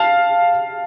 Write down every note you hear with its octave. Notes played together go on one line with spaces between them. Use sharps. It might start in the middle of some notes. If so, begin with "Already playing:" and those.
Already playing: F5 A5